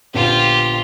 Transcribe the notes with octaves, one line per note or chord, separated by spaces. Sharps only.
A#1 D3 B3 F4 G4